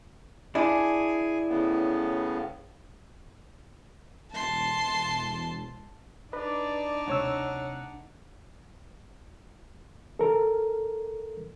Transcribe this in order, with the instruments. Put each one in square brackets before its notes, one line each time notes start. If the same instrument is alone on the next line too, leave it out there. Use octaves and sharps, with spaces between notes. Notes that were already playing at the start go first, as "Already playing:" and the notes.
[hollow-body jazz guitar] D4 E4 [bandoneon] G#4 G#5
[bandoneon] A2 C#3 B3
[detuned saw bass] E1 [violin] A5 C6
[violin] D4 D#4 [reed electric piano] B4 [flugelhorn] D5
[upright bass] D1 C3 [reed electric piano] C#2 C#5 E6 [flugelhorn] F#5
[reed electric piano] A4 A#4